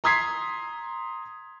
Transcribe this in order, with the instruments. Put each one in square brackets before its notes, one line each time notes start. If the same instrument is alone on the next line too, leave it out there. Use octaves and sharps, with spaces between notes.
[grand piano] A#5 C6 D#6 G#6 B6 C7